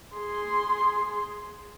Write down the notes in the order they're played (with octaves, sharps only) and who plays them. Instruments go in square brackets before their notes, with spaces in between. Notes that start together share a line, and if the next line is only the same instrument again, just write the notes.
[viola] G#4 C6